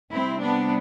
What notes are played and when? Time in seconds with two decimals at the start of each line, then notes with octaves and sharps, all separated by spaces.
0.12 C3 G3 C4 E4
0.41 B3 D4